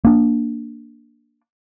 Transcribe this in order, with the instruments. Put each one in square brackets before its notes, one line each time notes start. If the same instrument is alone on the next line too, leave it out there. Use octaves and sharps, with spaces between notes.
[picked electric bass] A#3 D4